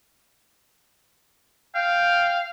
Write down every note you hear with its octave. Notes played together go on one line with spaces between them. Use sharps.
F5 G5